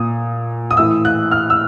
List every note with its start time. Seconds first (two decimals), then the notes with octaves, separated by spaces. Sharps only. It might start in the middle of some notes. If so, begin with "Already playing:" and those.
Already playing: A#2 D#6
0.71 D#6
0.77 A2 E3 E6
1.05 F#6
1.31 F6
1.50 E6